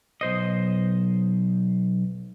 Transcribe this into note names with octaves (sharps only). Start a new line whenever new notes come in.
B1 C5 D#5